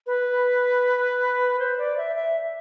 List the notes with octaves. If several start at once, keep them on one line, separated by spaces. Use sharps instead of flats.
B4
C5
D5
E5
E5